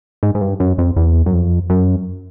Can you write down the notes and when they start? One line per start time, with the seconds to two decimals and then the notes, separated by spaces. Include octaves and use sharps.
0.23 G#2
0.35 G#2
0.41 G2
0.60 F#2
0.78 F2
0.96 E2
1.26 F#2
1.34 F2
1.70 F#2